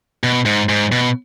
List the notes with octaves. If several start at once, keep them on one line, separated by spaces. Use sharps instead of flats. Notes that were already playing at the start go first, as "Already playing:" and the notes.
B2
G#2
G#2
B2